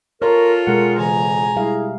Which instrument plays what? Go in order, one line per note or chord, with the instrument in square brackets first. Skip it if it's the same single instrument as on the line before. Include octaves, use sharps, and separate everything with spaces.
[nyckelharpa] F4 A4 [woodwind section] A#4 [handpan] C#5
[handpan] B2 G#3 G#4 [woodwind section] A#4 F#5
[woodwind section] F2 C#3 E3 [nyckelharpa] G#5 A#5
[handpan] G3 F5 [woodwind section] E4 G#4